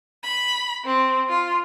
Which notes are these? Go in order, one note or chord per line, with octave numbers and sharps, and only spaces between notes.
B5
C4
F4